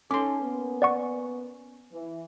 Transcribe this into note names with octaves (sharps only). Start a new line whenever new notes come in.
C#4 D#4 A4 C6 D6
A#3 B3
D5 F#5 C#6
E3